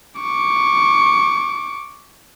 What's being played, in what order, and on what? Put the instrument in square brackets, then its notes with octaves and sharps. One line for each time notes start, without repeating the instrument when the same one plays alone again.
[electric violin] C#6 D6